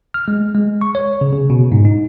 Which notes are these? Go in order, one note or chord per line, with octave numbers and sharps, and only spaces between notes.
F6
G#3
G#3
C#6
C#5
C#3
C#3
B2
G#2
D#4